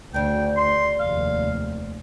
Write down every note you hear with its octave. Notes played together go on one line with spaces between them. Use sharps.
D2 C#3 D4 G5
C6
F1 D#2 F5